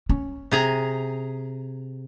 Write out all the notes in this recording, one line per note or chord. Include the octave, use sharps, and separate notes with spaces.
C#4
C3 G#4 A#5